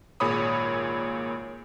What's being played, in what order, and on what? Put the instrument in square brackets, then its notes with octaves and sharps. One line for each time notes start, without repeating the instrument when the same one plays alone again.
[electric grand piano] G#1 A#2 G#4 C#5 B5 D#6